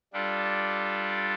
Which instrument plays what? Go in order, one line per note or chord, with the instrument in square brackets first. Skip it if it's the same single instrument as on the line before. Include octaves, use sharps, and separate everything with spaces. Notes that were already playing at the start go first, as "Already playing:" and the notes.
[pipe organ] G3 D4 F4 A4